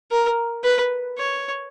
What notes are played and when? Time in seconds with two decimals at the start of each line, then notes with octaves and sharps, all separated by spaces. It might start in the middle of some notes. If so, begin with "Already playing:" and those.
0.12 A#4
0.64 B4
1.18 C#5